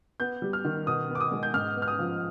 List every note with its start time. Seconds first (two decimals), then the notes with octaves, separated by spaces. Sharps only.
0.20 B3 G6
0.42 G3
0.53 F6
0.65 D#3
0.87 B2 D#6
1.10 B3
1.15 D6
1.20 D#6
1.32 G#3
1.43 G6
1.54 G#2 F6
1.77 B3
1.82 F6
1.88 D#6
1.99 F3